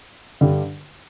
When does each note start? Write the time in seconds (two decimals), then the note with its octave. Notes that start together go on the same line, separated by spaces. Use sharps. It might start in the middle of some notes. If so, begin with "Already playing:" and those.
0.41 G2 D3 G3